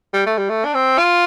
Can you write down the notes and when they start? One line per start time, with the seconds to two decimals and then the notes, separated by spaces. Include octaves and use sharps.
0.14 G3
0.27 A3
0.38 G3
0.50 A3
0.65 D4
0.74 C4
0.98 F4